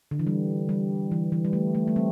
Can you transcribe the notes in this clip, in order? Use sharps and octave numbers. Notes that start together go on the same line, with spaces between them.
D3
E3
G3
G3
E3
E3
G3
A3
A3
A3
G3 C4